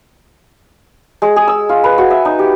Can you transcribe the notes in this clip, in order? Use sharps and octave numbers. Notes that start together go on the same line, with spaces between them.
G#3
G#4
E6
F4
B4
F#4
E5
D#4
G4